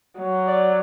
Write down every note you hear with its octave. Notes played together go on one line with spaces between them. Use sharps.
F#3
D5